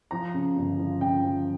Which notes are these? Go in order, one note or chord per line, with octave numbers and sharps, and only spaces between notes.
F3 A#5
C#3
G1
F3
C#3 G5
F3